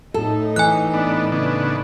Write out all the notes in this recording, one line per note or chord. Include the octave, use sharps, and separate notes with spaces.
A2 D#4 A4
E3 G#5 F#6
B3 D4
C#3 B3 D4